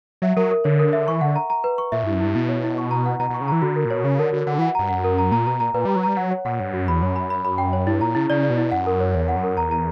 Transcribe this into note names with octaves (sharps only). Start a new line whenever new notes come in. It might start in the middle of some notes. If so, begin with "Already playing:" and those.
F#3 E5
F#3 A#4
A#4
D3 C#5
A#4
E5
E3 C#6
D3 F#5
A#5
A#5
B4
C#6
A#2 E5
G2 E4
F#2
G2 E4
B2 E4
C#5
E4
C#6
A#5
F#5
B2 A#5
B2 C#6
C#3
E3 A#5
D3 F#4
A#4
A#2
B2 C#5
C#3 C#5
D3 A#4
D3 F#4
D3 F#5
E3 F#5
G2 A#5
F#2 F#5
A#4
A#5
A#2 A#5
B2 A#5
A#2 A#5
A#2 B4
G3 A#5
F#3
G3 A#5
F#3 F#5
C#5
A#2 F#5
G2 C#5
F#2 F#4
E2 B5
F#2 C#5
B5
B5
B5
G5
C#5
G2 E4
A#2 A#5
C#3 E4
C#3 D5
D5
B2
E4
F#2 F#5
A#4
C#5
E2 C#5
F#5
F#2
A#4
E2 A#5
A#5